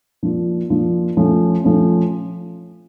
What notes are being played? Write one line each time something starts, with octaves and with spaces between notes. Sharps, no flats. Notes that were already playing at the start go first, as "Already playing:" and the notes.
F3 A#3 D4 F4
F3 A#3 D4 F4
F3 A3 C#4
F3 A3 C#4